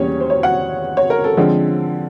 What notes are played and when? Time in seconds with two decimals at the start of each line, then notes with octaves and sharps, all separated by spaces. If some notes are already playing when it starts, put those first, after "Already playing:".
Already playing: E2 B2 G3 A#3 C#4 C#5
0.20 C5
0.30 C#5
0.43 F#5
0.97 C#5
1.10 A#4
1.24 A4
1.37 D3 F3 G#3 C4